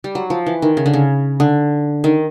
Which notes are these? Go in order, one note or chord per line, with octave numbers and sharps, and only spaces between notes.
G3
F#3
F3
E3
D#3
C#3
D3
C#3
D3
D#3